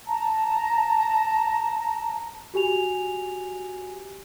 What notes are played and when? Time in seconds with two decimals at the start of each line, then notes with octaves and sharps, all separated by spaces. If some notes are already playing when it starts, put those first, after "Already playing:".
0.06 A5 A#5
2.54 F#4 G4 G#5 F7